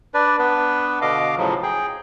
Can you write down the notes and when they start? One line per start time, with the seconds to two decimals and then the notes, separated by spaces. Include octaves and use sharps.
0.14 D4 B4 D5
0.39 B3 D4 B4
1.02 B2 D3 D#5 F5 D6
1.37 A2 C#3 F3 F#3
1.63 G#4 G5